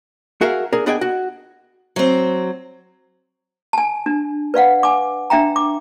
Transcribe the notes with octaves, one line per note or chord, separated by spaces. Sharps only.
F#4 G#4 A#4 E5 F5
D4 G#4 A#4
B3 D4 G#4 D#5 G5 G#5
F#4
F#3 C4
G#5 A5
D4
B4 D5 F5 F#5
G#5 D6
D4 E5 G5 A#5
D6